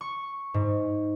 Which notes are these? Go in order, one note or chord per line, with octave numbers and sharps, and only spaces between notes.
C#6
G#2